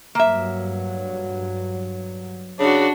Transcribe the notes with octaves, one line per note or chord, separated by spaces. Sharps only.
G2 F#3 A#3 E5
C#3 D4 F#4